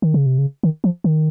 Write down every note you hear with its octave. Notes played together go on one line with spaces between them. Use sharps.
D#3
C#3
C3
C#3
D#3
F3
D#3